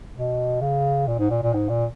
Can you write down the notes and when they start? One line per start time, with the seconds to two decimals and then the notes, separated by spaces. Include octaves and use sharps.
0.15 B2
0.61 C#3
1.08 A#2
1.19 G#2
1.31 A#2
1.43 A#2
1.54 G#2
1.69 A#2